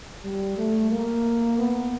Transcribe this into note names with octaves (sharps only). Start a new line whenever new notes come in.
G3
A3
A#3
B3